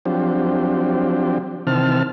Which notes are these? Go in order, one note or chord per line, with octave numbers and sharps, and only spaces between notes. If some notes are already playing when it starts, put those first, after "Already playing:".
F3 F#3 C4 D4 G4
C3 D#3 E3 C4 A5 F6